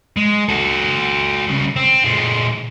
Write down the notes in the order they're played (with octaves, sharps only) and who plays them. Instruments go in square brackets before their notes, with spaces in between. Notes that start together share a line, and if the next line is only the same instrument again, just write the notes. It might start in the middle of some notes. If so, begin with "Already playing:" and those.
[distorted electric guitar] G#3
F#4 A4
C2 C#3
C4
A#2 G#3